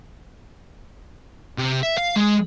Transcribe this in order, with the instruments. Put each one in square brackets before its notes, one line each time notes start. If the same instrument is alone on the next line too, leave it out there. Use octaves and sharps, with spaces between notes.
[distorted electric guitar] C3
E5
F5
G#3